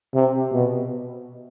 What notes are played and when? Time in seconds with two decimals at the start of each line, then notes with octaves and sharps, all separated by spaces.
0.14 C3
0.52 B2